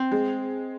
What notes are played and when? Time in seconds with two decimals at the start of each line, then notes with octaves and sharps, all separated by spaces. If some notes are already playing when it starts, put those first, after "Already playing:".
Already playing: C4
0.12 G#3